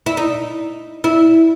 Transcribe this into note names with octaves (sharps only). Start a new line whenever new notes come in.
E4
D#4
E4